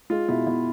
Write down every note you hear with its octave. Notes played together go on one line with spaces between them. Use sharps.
G#3 F4
B2 E4
B2 E4